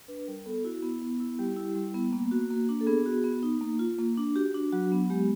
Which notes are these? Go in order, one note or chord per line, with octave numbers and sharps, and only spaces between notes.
D4 B4
G3 A#4
B3 A4
E4 F#4
B3
B3
E4
G3 G4
E4
G3
B3
A#3
F#4
A#3
D4
A4
B3 G#4
F#4
B3
D#4
A#3
F4
A#3
D4
F#4 G4
D4
F#3 F#4
B3
G#3 G4